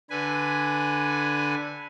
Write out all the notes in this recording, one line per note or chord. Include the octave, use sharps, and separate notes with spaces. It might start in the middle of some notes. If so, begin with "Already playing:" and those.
D3 B4 G#5